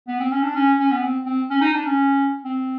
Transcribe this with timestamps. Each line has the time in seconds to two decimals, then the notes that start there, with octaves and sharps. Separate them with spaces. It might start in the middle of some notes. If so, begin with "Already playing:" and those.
0.08 B3
0.20 C4
0.32 C#4
0.43 D4
0.55 C#4
0.79 C#4
0.91 B3
1.02 C4
1.26 C4
1.50 C#4
1.61 D#4
1.73 D4
1.85 C#4
2.45 C4